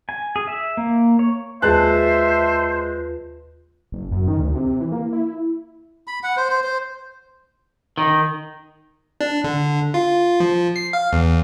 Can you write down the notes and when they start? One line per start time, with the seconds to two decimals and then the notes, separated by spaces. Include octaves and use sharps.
0.09 G#5
0.36 G#4
0.47 E5
0.77 A#3
1.19 C#5
1.62 D#2 G#3 F4 B4 C5 E5 A5 F#6
3.92 F#1
4.11 F#2
4.28 D#3
4.39 D2
4.55 C3
4.81 E3
4.92 A#3
5.13 E4
6.07 B5
6.23 F#5
6.37 C5
6.50 C5
6.64 C5
7.98 D#3
9.21 D4
9.44 D3
9.94 F4
10.40 F3
10.76 C7
10.93 F5
11.13 E2